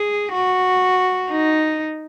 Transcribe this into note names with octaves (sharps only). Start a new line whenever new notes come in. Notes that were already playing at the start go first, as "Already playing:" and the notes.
Already playing: G#4
F#4
D#4